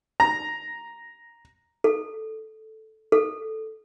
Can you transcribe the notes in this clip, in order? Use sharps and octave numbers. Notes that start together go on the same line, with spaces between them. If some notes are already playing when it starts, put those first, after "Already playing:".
A#5
A4
A4